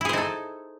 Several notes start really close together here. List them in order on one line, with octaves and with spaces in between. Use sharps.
E4 G#4 C5 D#4 A4